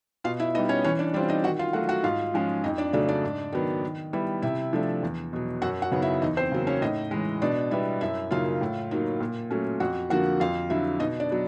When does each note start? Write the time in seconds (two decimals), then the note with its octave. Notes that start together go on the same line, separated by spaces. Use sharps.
0.24 B2 F4 F5
0.40 E4 E5
0.55 G3 B3 D#4 D#5
0.69 C#4 C#5
0.84 E3 C#4 C#5
0.99 D4 D5
1.14 G3 C4 D4 F4 D5
1.28 D#4 D#5
1.44 D#3 F#4 F#5
1.59 F4 F5
1.73 F#3 A3 F#4 F#5
1.89 F#4 F#5
2.03 G#2 F4 F5
2.34 F3 G#3 C#4
2.64 F2 D#4 D#5
2.78 D4 D5
2.93 C#3 F#3 A3 D4 D5
3.09 D4 D5
3.23 G#2
3.53 D#3 F#3 B3
3.84 D#3
4.13 G3 B3 E4
4.42 C3 E4 E5
4.73 F3 A3 D4
5.03 E2
5.33 B2 F#3
5.62 F#2 F#4 F#5
5.82 F#4 F#5
5.92 C#3 F#3 B3 D#4
6.02 E4 E5
6.22 E2 D#4 D#5
6.37 C4 C5
6.52 C#3 F#3 A#3
6.67 C#4 C#5
6.82 A2 D#4 D#5
7.11 E3 G#3
7.42 B2 D4 D5
7.71 G3 B3 E4 E5
8.01 F#2 E4 E5
8.31 C#3 F#3 A#3 D#4 F4 F5
8.61 A2
8.91 F#3 A#3 D#4
9.21 A#2
9.51 F#3 A3 C#4
9.80 F2 F#4 F#5
10.10 D3 F3 A#3 F#4 F#5
10.40 F2 F4 F5
10.70 D3 F#3 E4 E5
11.00 B2 D#4 D#5
11.20 D4 D5
11.31 F#3 B3